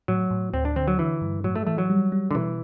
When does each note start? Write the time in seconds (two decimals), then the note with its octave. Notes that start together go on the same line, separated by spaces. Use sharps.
0.08 A2 F#3
0.31 A2
0.53 D2 C4
0.65 D4
0.76 D3 C4
0.88 F#3
0.99 D3 E3
1.21 G2
1.44 A2 F#3
1.56 A3
1.67 E3 A3
1.78 F#3
1.90 G3
2.12 G3
2.31 D3
2.35 B2 E3